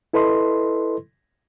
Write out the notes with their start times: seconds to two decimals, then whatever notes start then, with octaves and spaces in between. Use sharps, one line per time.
0.13 E4 A4 B4 D#5 C6